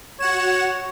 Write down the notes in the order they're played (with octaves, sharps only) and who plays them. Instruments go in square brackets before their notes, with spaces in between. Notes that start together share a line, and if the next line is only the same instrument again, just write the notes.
[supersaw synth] F#4 F#5 E7 [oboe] C#5